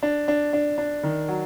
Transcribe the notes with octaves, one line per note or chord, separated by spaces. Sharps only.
D4
D4
D4
D4
D#3
F#3